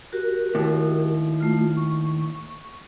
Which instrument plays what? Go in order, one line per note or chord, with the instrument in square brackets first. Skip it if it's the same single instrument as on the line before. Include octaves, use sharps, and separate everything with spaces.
[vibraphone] F#4 G4 A#4
[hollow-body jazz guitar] D#2 A2
[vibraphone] A3 F4
C#6